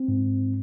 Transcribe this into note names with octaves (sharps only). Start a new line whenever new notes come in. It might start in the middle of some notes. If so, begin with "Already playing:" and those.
Already playing: C4
G#2